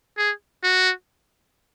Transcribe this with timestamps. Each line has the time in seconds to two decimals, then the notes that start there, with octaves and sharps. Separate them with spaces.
0.17 G#4
0.64 F#4